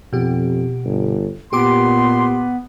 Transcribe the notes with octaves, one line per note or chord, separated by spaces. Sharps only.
F2 B2 G4
G1
A#2 B3 G4 C6 D6